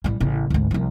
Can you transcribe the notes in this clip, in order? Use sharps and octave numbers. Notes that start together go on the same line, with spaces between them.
A1 G3
A1 C#3
G#1 D2
C2 F3